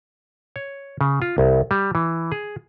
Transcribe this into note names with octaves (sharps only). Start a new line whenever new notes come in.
C#5
C#3
F4
C2
G3
E3
G#4